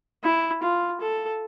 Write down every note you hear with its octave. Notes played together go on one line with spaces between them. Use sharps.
E4
F4
A4